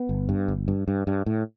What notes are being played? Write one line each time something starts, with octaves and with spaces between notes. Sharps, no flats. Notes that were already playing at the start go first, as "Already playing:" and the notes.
Already playing: B3
G1
G2
G1
G2
G2
G2
A2